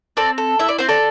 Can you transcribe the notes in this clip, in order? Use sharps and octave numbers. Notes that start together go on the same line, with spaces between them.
C4 A4 D5
A4
E4 E5
D5
C4 C5
A4 D5